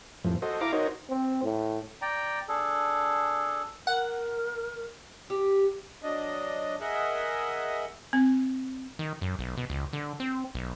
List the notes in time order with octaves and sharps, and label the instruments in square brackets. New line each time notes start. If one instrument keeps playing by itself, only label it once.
[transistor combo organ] F2 A2 F3
F#4 A4 C5 D#5
E4 F5 A#5 D6
D#4 F#4 A#4 C5 C#5 D#5
[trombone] C4
A2
[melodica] D5 G5 A#5
D4 G#4 A4
[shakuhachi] A#4 [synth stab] F#5
[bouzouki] G4
[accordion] F#3 D4 D#5
G#4 A#4 D#5 E5 F#5
[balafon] C4
[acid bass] D#3
F#2
B1
B2
C#2
D3
C4
B1